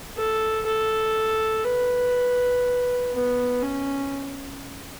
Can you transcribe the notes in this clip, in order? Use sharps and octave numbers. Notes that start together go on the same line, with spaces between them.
A4
A4
B4
B3
C#4